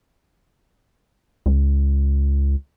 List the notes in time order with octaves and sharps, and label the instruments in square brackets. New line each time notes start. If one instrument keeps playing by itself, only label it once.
[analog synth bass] C#2